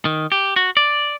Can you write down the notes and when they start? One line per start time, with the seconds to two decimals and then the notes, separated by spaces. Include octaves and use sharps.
0.05 D#3
0.32 G4
0.56 F#4
0.77 D5